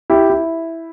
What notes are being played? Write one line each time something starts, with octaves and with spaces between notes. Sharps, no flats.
E4 G4
E4